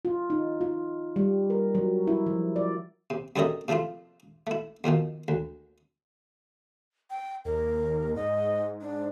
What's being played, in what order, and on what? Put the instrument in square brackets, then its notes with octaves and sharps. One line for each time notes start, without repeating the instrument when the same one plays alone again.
[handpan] F4
D#4
F4
G3
A#4
F#3
E4
F3
D5
[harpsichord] C3
F#2 D3 G3 C#5 D#5 E5
C3 F3 A3 E4 F4
A3 E4
F2 B2 D#3 F3
D2
[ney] G5
[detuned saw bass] D#2 [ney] A#4
[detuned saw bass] G#2 [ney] D#5
[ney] D4